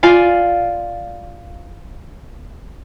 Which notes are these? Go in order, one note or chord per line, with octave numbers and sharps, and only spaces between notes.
F4 D5 F5 G#5